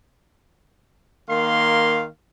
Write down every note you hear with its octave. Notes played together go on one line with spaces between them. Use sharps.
D#3 A#3 F5 C6